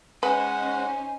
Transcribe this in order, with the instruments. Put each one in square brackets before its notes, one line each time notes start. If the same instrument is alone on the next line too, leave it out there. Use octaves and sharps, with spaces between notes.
[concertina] G#3 F#5 [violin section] C#4 D#4 C5 [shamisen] B4 [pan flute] G#5